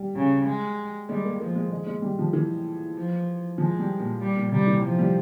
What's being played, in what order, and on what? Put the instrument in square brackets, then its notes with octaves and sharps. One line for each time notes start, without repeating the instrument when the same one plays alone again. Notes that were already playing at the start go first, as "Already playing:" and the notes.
Already playing: [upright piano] G3
[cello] C#3
G#3
[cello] G3 [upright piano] G#3
[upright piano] A#3
[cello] F3 [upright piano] A#3
[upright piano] G#3
G#3
G#3
G3
F3
E3
[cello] F3
[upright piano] F3 [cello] G#3
[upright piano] G3
A#2
[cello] G3
[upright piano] A#2
[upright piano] C3 [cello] G3
[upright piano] E3
[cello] F3
[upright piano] G3